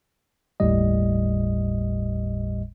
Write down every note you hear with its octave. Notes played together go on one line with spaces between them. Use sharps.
G1 D#2 A2 G3 D#5